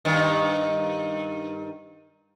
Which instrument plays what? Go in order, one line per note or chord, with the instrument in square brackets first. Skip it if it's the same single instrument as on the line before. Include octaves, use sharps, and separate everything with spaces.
[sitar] G2 D#3